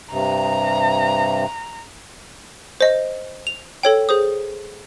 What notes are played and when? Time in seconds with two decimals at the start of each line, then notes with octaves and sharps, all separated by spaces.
0.11 G2 C3 A#5
2.81 C5 D#5
3.47 F7
3.83 A4 C#5 G5
4.09 G#4 C5 D#6